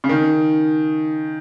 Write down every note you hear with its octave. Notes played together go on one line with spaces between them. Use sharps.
C#3
D#3